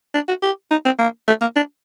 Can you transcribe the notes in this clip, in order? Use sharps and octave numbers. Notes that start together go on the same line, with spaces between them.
D4
F#4
G4
D#4
C4
A#3
A3
A#3
D4